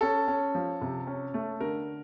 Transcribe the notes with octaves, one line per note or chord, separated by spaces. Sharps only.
C#4 A4
C#4
F3
C3
C#4
A3
D3 A#4